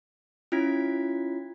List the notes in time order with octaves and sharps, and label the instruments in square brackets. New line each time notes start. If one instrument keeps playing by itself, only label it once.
[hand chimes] C#4 E4 F4 G#6 B6